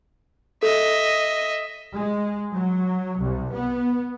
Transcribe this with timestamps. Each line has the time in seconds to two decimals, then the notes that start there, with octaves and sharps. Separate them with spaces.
0.63 A4 D#5 E5
1.94 G#3
2.52 F#3
3.21 C2
3.53 B3